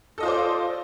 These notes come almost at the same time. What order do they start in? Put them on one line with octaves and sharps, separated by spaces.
A4 D#5 F4 C5 D5